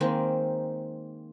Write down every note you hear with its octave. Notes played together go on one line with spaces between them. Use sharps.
D#3 G#3 A#3 C4